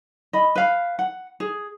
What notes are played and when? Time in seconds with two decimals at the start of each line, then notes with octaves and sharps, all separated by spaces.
0.33 D#5 B5
0.56 B4 F5
0.99 F#5
1.40 G#4